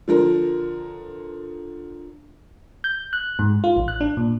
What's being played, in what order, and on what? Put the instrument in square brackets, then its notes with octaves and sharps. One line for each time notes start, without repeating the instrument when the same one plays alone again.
[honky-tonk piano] D3 F3 A#4
[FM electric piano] G6
F#6
G#2
F4
A1
F#6
D4
A#2